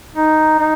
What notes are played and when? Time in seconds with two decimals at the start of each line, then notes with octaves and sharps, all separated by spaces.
0.15 D#4
0.59 D#4